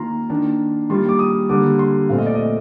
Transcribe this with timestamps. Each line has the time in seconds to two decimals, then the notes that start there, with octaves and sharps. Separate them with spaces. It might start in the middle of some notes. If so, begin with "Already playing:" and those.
Already playing: D#3 A#3 F4 A#5 C6
0.30 D#3 A#3 D4
0.89 D#3 G3 A#3 F4 C6
1.09 D6
1.19 D#6
1.49 D3 G3 A#3 D6
1.79 C6
2.09 A#2 A3 C4 F5
2.18 D#5
2.26 D5
2.35 D#5